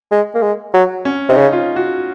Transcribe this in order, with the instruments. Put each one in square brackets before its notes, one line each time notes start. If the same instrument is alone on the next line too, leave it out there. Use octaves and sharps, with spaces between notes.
[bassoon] G#3
A#3
G#3
F#3
[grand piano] C#4
[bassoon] C3 [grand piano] D#4
[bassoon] C#3
[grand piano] F4
F#4